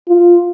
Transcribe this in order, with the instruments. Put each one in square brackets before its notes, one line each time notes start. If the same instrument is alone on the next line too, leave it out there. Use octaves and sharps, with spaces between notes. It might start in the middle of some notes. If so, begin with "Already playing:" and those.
[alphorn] F4